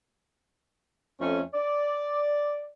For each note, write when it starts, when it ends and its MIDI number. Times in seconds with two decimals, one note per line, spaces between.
1.21 1.42 41
1.21 1.42 57
1.21 1.42 61
1.54 2.68 74